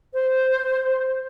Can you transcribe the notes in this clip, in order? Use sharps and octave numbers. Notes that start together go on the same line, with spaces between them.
C5